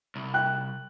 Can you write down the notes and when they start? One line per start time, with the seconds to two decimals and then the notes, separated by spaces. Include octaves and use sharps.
0.15 C2
0.34 G5 F#6